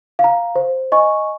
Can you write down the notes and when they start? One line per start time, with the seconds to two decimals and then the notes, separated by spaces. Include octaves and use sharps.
0.19 F5
0.24 A#5
0.56 C5
0.92 D#5 G#5 C#6